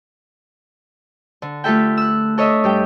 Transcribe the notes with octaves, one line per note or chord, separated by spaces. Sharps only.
D3
A3 F4 G4 A4 E5 G5
E6 F#6
A4 C#5 D#5 E5
G2 G4 G5